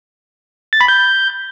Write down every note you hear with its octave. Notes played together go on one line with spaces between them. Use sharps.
A6
B5
G6